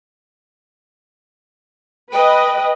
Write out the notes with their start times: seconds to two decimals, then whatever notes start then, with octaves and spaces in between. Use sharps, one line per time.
2.13 B4 D#5 G5